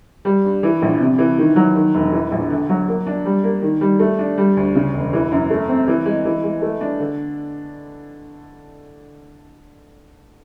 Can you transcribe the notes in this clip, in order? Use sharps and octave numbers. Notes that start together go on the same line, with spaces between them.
G3
G2
E3
A#1
C3
E3
D#3
F#3
D#3
E1
E3
A#1
D3
F#3
A#3
D4
G3
A#3
D#3
G3
A3
D4
G3
D2
C#3
E1
E3
F#2
A3
C4
E3
G#3
E3
G#3
A3
D4
D3